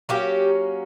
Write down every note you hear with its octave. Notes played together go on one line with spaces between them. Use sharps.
F#3 A#3 C#4 G4